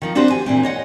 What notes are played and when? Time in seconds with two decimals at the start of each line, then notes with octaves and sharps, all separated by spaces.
0.02 D#3 F3 D#4
0.15 C4 D4 F#4 G4 B4 C5
0.30 G#5
0.46 A#2 E3 C4
0.63 C#5 D#5 F#5